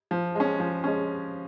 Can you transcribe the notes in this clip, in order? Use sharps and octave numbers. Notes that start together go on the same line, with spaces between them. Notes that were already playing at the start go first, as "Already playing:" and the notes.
F3
G#3 C#4
F3
G#3 C#4